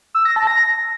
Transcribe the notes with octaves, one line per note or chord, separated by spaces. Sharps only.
E6
A#6
A5
A#6